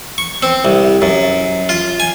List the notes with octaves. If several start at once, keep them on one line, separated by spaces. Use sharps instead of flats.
C#6
C4
C2
F#2
F4
G#5